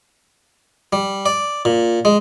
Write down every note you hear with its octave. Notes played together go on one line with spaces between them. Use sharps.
G3
D5
A#2
G#3